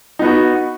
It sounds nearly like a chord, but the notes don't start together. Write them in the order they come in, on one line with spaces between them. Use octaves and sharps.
D#4 B3 F#4